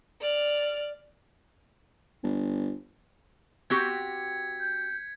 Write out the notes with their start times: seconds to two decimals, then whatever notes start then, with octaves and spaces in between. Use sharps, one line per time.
0.21 D5 F6
2.23 G1
3.70 C4 F#4 G4 G#6 B6 C#7
4.60 G6